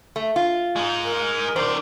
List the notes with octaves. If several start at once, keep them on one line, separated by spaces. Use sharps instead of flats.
A3
F4
G#3 D#4
A#4
D#3 C5 D5